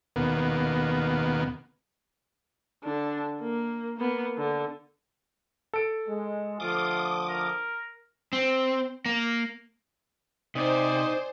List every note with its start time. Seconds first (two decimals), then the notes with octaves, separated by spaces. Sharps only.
0.16 D#2 B2 A#3 B3
2.84 D3 D4
3.41 A#3
3.97 A#3 B3
4.38 D3
5.74 A4 D7
6.08 G#3
6.60 D3 F3 A3 F4 D6 D#6
7.29 A#4
8.33 C4
9.06 A#3
10.55 C3 D#4 C5 D5 G#5